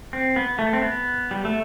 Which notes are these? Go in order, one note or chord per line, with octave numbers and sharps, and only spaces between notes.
C4
B3
A3
C4
B3
G3
A3